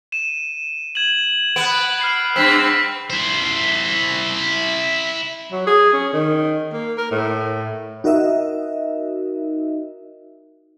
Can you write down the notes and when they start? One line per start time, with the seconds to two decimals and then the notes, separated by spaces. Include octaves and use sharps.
0.12 D#7 E7
0.95 G#6 E7 F#7
1.56 B3 F#6 D7
2.01 F6 C7
2.36 G2 C4 E6 B6
3.10 E4 C5
5.52 F#3
5.67 G#4
5.93 C#4
6.13 D#3
6.73 A#3
6.98 A#4
7.12 A2
8.04 D#4 F#4 A#4 D#5 E5